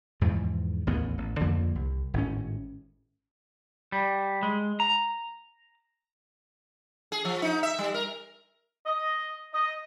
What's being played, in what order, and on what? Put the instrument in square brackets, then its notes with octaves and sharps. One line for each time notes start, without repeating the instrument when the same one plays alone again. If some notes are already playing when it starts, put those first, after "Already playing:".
[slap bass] E2 G#2 E3 F3
A1 D#2 A2 B3
A1
F2 D3 F3 A#3
C2
G#1 A2 C#4
[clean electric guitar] G3
G#3
A#5
[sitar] G#4
F3
D#4
E5
G3
A#4
[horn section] D#5
D#5